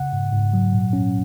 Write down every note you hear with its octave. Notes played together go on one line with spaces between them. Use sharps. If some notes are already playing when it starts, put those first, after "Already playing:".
Already playing: C#3 F#5
G#2
G#2
F#3
A#2
C#4